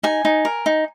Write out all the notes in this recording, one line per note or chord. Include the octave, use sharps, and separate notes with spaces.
D#4 G#5
D#4
A#4
D#4